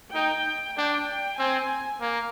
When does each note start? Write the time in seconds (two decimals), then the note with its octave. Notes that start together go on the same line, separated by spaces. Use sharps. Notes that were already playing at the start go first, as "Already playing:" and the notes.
0.14 D#4 G5
0.77 D4 G5
1.39 C4 G#5
2.01 A#3